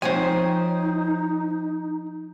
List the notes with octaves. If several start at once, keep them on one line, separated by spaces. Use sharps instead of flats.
F3 C4 D#4 C5 C#5 G#5